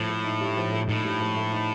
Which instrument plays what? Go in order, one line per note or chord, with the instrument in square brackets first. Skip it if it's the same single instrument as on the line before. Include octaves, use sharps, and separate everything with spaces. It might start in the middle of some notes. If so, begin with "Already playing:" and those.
Already playing: [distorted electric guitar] A2 [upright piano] F3
[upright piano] A3
D#4
G2
F3
A3
[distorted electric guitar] A2 [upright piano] D#4
[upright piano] G2
F3
A3
D#4